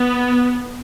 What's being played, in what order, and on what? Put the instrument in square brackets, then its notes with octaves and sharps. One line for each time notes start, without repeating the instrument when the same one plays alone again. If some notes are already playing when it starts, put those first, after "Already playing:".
Already playing: [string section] B3